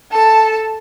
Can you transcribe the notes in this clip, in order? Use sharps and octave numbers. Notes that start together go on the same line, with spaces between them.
A4 A5